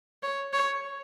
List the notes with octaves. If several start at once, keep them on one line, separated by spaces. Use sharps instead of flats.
C#5
C#5